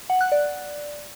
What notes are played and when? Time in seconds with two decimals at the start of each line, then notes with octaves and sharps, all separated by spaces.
0.10 F#5
0.21 F#6
0.32 D5